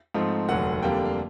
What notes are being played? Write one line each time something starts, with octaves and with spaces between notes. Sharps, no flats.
G#2 F3 A3 C4 D#4
F1 D#2 D3 F#3 F#5
F2 D3 G3 A#3 D4 G5
F5